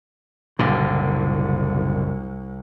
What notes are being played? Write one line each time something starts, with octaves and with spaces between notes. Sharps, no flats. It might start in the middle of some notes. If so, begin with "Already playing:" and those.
F#1 C2 A#2 D3